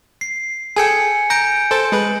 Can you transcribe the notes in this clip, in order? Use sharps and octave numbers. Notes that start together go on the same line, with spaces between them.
C7
G#4 A4 G5 G#5 G#6 C#7
A#5 G6 A#6 D7
A4 C5 A6
G#3 B4